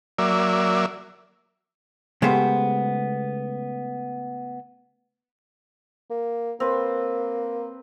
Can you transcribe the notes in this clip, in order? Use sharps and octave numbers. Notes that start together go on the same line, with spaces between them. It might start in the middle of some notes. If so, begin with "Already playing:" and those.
F#3 A#3 D5 E5
C#3 G#3 A3 B3 G4 C5
A#3
A#3 C4 B4